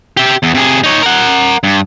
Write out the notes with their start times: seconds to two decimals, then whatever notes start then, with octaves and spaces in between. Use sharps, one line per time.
0.17 G4 E5
0.43 E2
0.55 C3 G#4
0.84 D#4 C#5
1.02 A#4 F#5
1.63 G2